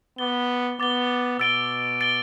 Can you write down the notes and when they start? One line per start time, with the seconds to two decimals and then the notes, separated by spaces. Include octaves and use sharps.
0.18 B3 D6 A6 G7
0.80 B3 D6 A6 G7
1.39 B2 E6 A6 D7 G7
2.01 A6 D7 G7